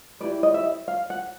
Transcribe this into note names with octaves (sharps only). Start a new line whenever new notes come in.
E4 G4 B4 D5
D#5
E5
F5
F#5